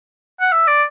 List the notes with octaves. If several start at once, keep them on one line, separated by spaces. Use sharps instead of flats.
F#5
E5
D5